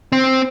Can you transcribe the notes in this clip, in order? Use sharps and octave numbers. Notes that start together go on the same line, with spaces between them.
C4